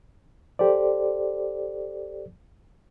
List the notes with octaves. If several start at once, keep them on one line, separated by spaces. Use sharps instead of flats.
G4 A4 C5 D5